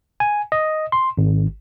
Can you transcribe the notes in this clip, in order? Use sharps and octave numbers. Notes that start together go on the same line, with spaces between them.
G#5
D#5
C6
G#1